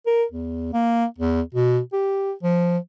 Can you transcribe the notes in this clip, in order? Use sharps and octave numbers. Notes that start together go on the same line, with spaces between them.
A#4
E2
A#3
E2
B2
G4
F3